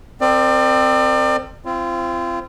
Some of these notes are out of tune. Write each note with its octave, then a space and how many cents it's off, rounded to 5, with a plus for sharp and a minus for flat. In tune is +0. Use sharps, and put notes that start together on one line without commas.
C4 +0 A#4 -35 D5 +35
C4 +0 F4 -30